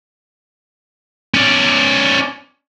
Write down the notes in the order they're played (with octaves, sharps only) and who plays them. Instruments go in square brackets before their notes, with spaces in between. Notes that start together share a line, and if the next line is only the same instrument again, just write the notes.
[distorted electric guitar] C#4 D5